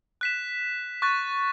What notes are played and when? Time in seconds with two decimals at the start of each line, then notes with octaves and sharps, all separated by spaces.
0.21 F#6 B6 E7
1.02 C#6 F#6 A6